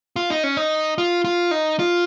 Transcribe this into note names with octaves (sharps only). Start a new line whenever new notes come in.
F4
D#4
C#4
D#4
F4
F4
D#4
F4